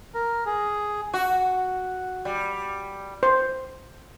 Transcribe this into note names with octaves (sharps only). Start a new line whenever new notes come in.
A#4
G#4
F#4
G3
C5